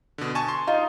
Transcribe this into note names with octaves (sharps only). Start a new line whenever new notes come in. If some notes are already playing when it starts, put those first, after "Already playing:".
B2 D3
G#5 A5 C#6
C6
D#4 F4